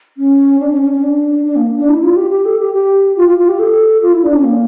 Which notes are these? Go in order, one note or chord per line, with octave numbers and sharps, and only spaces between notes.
C#4
D4
C#4
C#4
C#4
D4
D4
A#3
D4
E4
F4
G4
G4
A4
G4
G4
F4
F4
F4
G4
A4
F4
E4
D4
C#4
A#3